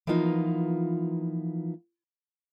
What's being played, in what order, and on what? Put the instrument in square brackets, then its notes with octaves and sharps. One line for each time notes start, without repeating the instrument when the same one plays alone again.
[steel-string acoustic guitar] E3 F3 A#3 B3 D#4 F4